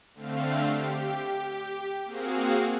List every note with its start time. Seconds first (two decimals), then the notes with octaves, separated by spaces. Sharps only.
0.15 D3 A3 C4 F5
0.64 G4
2.05 A#3 C4 F#4 G#4 F5